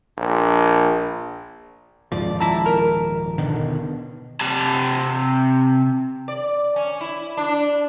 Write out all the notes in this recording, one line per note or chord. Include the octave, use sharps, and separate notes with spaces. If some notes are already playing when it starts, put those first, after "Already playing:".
A#1
D#1 G#2 F3 D5
E4 A5 A#5
A#4
B2 D3 D#3
C3 A5
D5
C#4
E4
D4